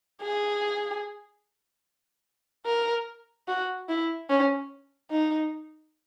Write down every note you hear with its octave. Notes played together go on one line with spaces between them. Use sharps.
G#4
A#4
F#4
E4
C#4
D#4